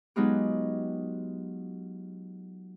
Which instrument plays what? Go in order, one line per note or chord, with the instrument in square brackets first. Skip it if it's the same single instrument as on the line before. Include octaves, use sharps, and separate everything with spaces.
[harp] F#3 G#3 B3 D#4 F4 G4